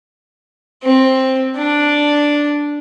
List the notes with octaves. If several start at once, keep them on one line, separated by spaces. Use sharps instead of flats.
C4
D4